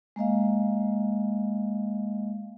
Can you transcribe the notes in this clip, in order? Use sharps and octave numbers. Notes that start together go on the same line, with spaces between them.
G#3 A#3 D#5 F5